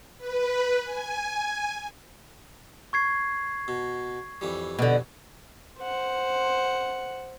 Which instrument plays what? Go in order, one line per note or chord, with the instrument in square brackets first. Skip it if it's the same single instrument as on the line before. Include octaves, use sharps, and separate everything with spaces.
[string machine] B4
G#5
[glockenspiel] C#6 G#6 C7
[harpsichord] B2
F2 E3 G3
[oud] B2 D3
[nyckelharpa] C5 F#5